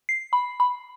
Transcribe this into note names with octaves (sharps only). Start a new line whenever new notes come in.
C7
B5
B5